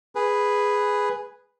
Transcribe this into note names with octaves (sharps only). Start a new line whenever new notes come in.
G#4 B4